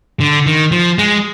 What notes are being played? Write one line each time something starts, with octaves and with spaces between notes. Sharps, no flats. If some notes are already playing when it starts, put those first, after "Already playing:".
D3
D#3
F3
G#3